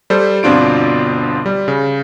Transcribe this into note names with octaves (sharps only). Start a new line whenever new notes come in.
G3 A4 C5
G1 B2 C4 D4 F4 D7
G3
C#3